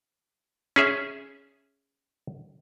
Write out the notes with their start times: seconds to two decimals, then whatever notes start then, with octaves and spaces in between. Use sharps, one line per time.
0.76 C#4 G#4 E5